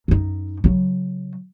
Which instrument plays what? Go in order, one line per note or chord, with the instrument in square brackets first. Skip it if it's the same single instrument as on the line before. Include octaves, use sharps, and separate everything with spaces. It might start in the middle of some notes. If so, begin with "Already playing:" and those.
[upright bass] F#2 D#4
C#3 F#3